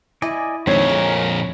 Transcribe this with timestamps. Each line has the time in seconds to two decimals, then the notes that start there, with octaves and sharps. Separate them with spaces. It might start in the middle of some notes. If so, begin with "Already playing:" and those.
0.22 E4 D5 D#5 G#5
0.67 F2 A#2 D#3 G#3 A3 C4 D4 C#5
0.89 G#3 A#4